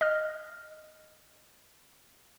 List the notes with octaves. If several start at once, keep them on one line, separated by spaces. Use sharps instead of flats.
D#5 F6